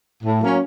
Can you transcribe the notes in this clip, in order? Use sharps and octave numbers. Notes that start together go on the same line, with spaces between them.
A2
F#3 A#3 C#4